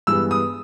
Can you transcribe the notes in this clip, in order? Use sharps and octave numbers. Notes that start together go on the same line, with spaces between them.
G2 E3 G#3 B3 E6
D#6